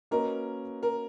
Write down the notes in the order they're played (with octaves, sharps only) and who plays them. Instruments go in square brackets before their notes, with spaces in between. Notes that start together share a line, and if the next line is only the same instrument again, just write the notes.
[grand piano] A#3 C#4 F#4 B4 D#5 [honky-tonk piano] A#4
[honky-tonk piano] A#4